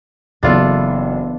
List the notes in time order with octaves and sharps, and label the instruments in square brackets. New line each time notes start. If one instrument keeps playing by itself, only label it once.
[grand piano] F#1 [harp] E3 B3 [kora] D4 F4 A4